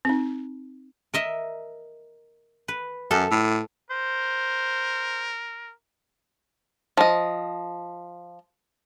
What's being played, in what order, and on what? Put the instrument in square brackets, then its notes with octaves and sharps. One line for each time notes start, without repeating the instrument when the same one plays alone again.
[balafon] C4 D#4
[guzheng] A#4 D#5 E5
B4
[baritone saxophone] F#2 [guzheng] A4
[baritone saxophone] A2
[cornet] A#4 [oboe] C5
[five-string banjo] F3 D#5